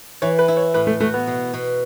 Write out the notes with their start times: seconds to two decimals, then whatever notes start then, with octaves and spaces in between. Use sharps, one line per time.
0.22 E3 C#5
0.39 B4
0.48 E4
0.57 C#5
0.74 A2 B4
0.87 A3
1.00 A3 F#4
1.14 B3
1.27 B2
1.54 B2